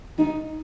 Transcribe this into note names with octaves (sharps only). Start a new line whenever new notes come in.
D#4